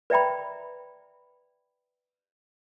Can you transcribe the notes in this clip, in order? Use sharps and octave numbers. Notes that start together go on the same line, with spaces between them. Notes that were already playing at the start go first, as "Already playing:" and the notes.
B4 D5 E5 G5 A#5 B5